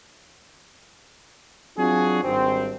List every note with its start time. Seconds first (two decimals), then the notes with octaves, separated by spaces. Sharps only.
1.77 F#3 C4 D4 F4 F#4 G#4
2.23 G#1 G2 C4